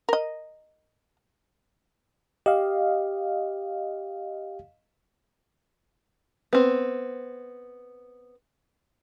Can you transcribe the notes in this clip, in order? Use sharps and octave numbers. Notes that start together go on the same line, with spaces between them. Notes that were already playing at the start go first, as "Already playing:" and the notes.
A#4 D#5
G4 D#5 F5
B3 C4